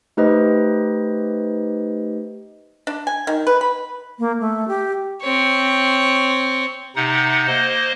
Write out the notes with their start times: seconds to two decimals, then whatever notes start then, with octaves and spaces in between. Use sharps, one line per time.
0.17 A3 D#4 G4 B4 C5 D#5
2.87 D4
3.07 G#5
3.27 D#3
3.47 B4
3.61 B5
4.19 A#3
4.40 A3
4.68 G4
5.22 C4 C#5
6.96 C3 D#4 F#5
7.47 A#3 C5 D#5